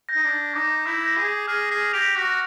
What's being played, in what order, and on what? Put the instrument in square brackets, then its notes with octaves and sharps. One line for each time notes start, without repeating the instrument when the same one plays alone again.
[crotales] G6 A#6
[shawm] D#4
D4
[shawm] D#4 [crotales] D6
[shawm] E4
[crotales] G6 A#6
[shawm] G#4
[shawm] G#4 [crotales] F6
[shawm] G#4
[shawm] G4 [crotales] A#6 D7 F7
[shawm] F#4